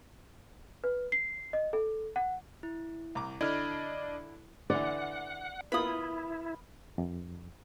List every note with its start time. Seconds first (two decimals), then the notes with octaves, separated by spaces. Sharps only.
0.84 B4
1.12 C7
1.53 D#5
1.73 A4
2.16 F#5
2.63 E4
3.15 C2 A#5 D6
3.41 D3 D4 E4 D5 D#5 B5 F6 G#6
4.70 D3 E3 D5 F#5
5.72 B3 E4 F4 A#4 B5 D#6
6.98 F2